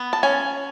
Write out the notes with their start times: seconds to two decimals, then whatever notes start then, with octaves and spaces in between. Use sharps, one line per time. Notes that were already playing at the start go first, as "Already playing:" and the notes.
Already playing: B3
0.13 A5
0.23 C#4 G#5